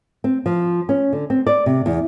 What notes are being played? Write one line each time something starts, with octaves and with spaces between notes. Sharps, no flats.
C4
F3
C#4
D3
C4
D5
C3
E2